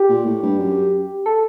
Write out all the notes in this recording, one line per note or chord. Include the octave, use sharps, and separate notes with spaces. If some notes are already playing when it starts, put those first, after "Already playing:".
Already playing: G4
A#2
A2
G2
F#2
A4